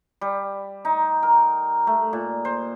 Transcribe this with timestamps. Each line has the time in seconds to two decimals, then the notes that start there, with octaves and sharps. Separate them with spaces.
0.21 G3
0.85 D#4
1.23 A#4
1.87 A3
2.13 A#2
2.45 C5